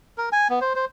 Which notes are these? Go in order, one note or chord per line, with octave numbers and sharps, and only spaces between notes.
A#4
G#5
B3
C5
C5